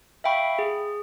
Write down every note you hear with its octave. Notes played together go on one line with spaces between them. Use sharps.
E5 F5 G5 B5 C#6
G#4